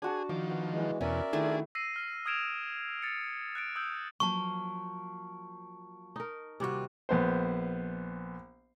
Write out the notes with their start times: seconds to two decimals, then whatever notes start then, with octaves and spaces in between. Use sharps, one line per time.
0.02 D4 F#4 G#4 A5
0.29 D#3 F3 D6
0.50 B3
0.70 E3 G#3
1.01 E2 B2 C#4 A#4 D5 E5
1.33 D#3 A3 D4 E4 G#4
1.75 E6 A#6 C7 D#7
1.96 F6
2.26 D#6 F6 G#6 D7 E7 F7
3.02 A6 C#7
3.55 F#6 A6 D7
3.76 D#6 E6 G6
4.20 F3 F#3 A#3 A5 C#6
6.16 D#4 A#4
6.60 D#2 C3 G3 F4 F#4
7.09 A#1 B3 C5